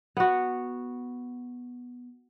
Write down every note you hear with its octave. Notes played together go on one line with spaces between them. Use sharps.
B3 F#4